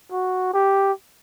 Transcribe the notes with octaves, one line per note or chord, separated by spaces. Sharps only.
F#4
G4